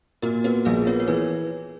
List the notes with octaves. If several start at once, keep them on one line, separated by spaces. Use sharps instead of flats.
A#2 F#4 A#4
B3 F#4 A#4
A#1 G#4 B4
B3 A#4 C#5
C#5
E3 G#4 B4